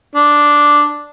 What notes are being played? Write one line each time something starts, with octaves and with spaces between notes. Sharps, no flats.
D4